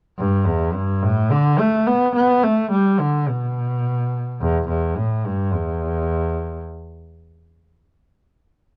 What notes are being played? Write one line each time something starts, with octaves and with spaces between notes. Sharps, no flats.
G2
E2
G2
A2
D3
A3
B3
B3
A3
G3
D3
B2
E2
E2
A2
G2
E2